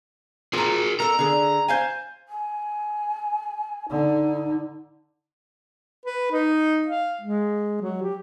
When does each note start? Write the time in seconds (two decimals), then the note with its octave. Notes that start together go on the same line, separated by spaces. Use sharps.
0.53 F4 G#4 A#4 A#5
1.00 A4 A#4 A#5
1.19 D3 G#4
1.68 C5 F5 G#5
2.28 G#5
3.90 D3 D#4
6.05 B4
6.32 D#4
6.86 F5
7.21 G#3
7.81 F#3
8.02 G4